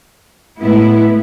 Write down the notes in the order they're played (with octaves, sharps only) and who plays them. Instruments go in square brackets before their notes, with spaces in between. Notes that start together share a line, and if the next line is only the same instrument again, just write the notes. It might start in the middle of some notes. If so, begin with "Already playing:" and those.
[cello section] A2 G#3 B3 E4